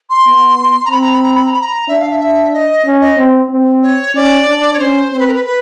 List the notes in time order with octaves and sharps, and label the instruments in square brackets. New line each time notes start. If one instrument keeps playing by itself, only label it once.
[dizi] C6
[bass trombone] B3
[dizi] A#5
[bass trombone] C4 [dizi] B5
[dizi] A#5
B5
A#5
B5
A#5
B5
A#5
[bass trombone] D4 [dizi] E5
[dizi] F5
E5
E5
D#5
[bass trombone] C#4
[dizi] D#5
[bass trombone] C4
C4
[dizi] C#5
[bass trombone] C#4 [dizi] D5
[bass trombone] D4
[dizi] C#5
[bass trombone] C#4 [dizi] C5
[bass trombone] C4 [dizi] C5
[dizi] B4
A#4
B4
B4